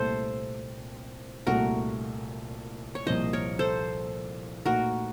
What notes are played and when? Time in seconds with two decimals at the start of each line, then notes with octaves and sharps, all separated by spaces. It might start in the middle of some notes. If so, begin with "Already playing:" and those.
Already playing: C2 A#2 A3 C4 A4 C5
1.47 C2 A#2 A3 F#4 A#4
2.95 C#5
3.06 C2 A#2 F3 C5 D#5
3.33 A#4 C#5
3.59 A4 C5
4.66 A#2 A3 D#4 F#4 A#4